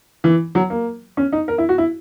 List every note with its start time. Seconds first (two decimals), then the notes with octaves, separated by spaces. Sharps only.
0.24 E3
0.55 F#3
0.70 A#3
1.17 C#4
1.32 D#4
1.48 A#4
1.58 E4
1.69 F#4
1.78 E4